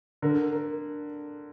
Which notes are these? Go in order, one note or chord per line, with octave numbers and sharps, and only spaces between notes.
D3 A#4
A#4